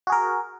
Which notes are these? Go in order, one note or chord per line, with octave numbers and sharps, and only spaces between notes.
F#4 G#4 A#4